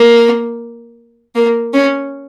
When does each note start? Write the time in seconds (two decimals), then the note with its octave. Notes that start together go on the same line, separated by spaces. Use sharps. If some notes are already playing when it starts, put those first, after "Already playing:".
Already playing: A#3
1.35 A#3
1.74 C#4